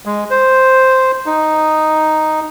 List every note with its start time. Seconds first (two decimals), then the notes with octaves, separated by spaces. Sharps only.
0.05 G#3
0.30 C5
1.26 D#4